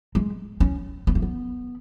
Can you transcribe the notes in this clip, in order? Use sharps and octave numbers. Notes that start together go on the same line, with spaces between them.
G#3
C#4
B3
A3
B3